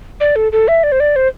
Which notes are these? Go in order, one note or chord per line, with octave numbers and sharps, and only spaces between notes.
D5
A4
A4
E5
D5
C5
D5
C5